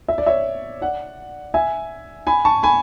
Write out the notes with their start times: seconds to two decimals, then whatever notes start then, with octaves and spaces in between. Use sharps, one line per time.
0.08 E5
0.18 D5
0.26 C#5 E5
0.81 D5 F#5
1.54 E5 G#5
2.27 G#5 B5
2.45 A5 C#6
2.63 G#5 B5